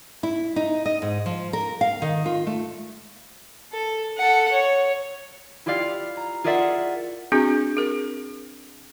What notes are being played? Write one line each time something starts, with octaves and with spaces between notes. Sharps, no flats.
E4
D#4
D#5
G#2
F3
A#4
F5
D#3
F4
A3
A4
A4 F#5
C#5
E4 F4 G4 D5 F5
A#5
F4 G#4 A#4 D5 E5 F#5
C4 D4 F#4 G#4
G#4 A#4